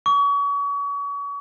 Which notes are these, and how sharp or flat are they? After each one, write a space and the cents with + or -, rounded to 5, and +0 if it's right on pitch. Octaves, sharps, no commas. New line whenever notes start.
C#6 +35